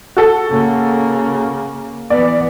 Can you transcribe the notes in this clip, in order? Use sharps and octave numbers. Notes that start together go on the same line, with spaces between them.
F#4 A4
C#3 A#3
E3 B3 D5